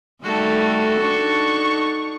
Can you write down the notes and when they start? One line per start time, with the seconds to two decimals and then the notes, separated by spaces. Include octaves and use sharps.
0.24 D#3 G3 A3 F#4 A4
1.01 D4 D#4 C#6